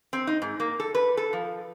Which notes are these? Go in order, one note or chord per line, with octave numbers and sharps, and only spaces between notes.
C4
D#4
G#2
A#3
A4
B4
A4
F3